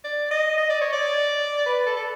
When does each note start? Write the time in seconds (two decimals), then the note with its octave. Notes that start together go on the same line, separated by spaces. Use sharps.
0.04 D5
0.31 D#5
0.58 D#5
0.70 D5
0.81 C#5
0.93 D5
1.66 B4
1.86 A4
1.96 A4